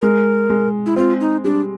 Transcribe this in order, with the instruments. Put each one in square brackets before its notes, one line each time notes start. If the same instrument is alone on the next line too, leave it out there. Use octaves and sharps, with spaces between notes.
[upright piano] G#3 [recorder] A#4
[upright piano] G#3
[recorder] E4
[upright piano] C4 [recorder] F4
[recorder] D#4
[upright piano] G3 [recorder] D4